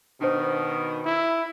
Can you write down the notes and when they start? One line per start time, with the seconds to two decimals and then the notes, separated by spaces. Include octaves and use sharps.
0.21 B2 D#3 D4 C5
1.05 E4